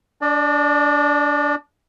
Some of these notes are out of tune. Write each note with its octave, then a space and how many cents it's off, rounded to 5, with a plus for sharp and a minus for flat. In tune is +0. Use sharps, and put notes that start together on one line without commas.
D4 -20 D5 +30